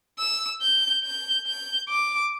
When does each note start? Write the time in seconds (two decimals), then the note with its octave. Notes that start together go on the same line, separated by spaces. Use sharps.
0.19 E6
0.61 G6
1.04 G6
1.47 G6
1.90 D6